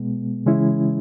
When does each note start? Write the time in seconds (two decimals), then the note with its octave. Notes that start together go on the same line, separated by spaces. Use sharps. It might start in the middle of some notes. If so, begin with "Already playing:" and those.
Already playing: B2 G#3 B3
0.46 C#3 E3 G#3 C#4 E4